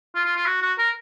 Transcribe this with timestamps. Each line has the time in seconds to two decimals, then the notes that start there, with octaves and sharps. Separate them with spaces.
0.15 F4
0.25 F4
0.36 F4
0.46 F#4
0.62 F#4
0.79 A#4